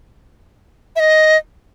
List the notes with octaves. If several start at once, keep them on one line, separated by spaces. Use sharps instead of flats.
E5
D#5